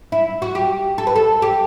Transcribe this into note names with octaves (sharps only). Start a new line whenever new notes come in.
E4
F#4
G4
A4
B4
A4
G4